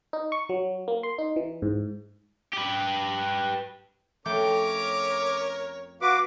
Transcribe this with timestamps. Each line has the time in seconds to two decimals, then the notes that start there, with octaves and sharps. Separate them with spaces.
0.13 D#4
0.32 C#6
0.49 F#3
0.88 A#3
1.03 C6
1.18 D#4
1.36 E3
1.62 G#2
2.54 G4 B4
4.26 F2 A3 C#4 A#4 C#5 G5 D6
6.02 F#4 B4 F5 D6